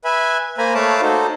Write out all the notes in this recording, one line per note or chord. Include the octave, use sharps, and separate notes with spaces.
B4 E5 G#5 B5
A#3 C5 G#5 A#5 B5
A3 C#5 F5 A5 B5 D6
D#4 F#4 A4 C5